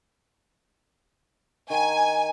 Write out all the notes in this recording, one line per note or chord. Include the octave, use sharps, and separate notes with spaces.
D#3 G#5